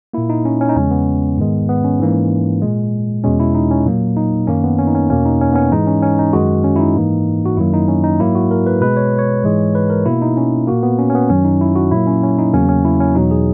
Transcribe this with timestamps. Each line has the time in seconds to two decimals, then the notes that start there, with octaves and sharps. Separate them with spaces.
0.14 A#2 A#3 E4
0.30 D#4
0.45 C#4
0.61 C#4
0.69 D#4
0.76 E2 C#3 G#3 C#4
0.91 B3
1.38 G#2 D#3 G#3
1.69 B3
1.85 C#4
1.99 G#2 E3 A#3
2.62 A#2 G#3
3.24 E2 B2 G#3 C#4
3.40 E4
3.55 D#4
3.71 C#4
3.85 A#2 F#3 A#3
4.16 D#4
4.47 F#2 D#3 A#3 C#4
4.64 B3
4.79 C#4
4.87 D#4
4.95 C#4
5.10 E2 B2 A#3 C#4
5.25 D#4
5.41 C#4
5.53 B3
5.56 C#4
5.72 G#2 E3 G#3 D#4
5.87 C#4
6.02 C#4
6.19 D#4
6.33 F#2 D#3 G#3 F#4
6.64 C#4
6.76 E4
6.80 D#4
6.96 G#2 E3 A#3
7.46 F#4
7.57 F#2 D#3 F#3 A#3 E4
7.74 D#4
7.88 C#4
8.04 D#4
8.20 G#2 F#3 A#3 E4
8.35 F#4
8.51 A#4
8.67 B4
8.81 B2 G#3 B4
8.97 C#5
9.19 C#5
9.44 G#2 E3 G#3
9.75 B4
9.90 A#4
10.06 B2 A#3 E4
10.22 D#4
10.37 C#4
10.67 A#2 A#3 F#4
10.83 B3
10.99 C#4
11.10 C#4
11.15 B3
11.30 F#2 D#3 F#3 C#4
11.45 D#4
11.61 E4
11.76 F#4
11.92 A#2 F#3 A#3 E4
12.07 C#4
12.23 C#4
12.38 D#4
12.53 E2 C#3 F#3 A#3 C#4
12.69 C#4
12.85 E4
13.00 C#4
13.15 E2 B2 F#3 D#4
13.31 G#4